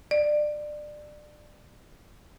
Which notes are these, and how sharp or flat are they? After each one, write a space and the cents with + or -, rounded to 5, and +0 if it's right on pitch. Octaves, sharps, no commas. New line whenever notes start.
D5 +25